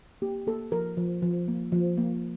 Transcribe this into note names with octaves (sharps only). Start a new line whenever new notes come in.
A#3 G4
A#3 A4
F3 A#4
F3
F3
A#3
F3
A#3